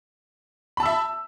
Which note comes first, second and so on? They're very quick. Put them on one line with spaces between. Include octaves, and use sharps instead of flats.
B5 A5 E6 E5